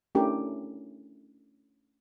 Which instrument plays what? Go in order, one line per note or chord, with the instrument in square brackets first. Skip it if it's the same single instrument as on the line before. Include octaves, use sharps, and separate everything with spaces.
[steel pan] A3 C#4 D4 E4 G4 A#4